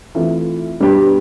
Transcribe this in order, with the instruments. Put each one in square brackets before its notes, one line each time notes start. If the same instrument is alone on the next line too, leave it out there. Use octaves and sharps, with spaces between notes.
[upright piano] E3 A3 C4 F4
B2 G3 B3 D4 G4